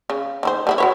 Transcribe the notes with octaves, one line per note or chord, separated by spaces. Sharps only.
C#3
D#3 E4 C5
G3 B3 E4
F#4 B4 C#5